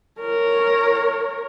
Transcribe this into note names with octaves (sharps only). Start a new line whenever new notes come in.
A#4 C#5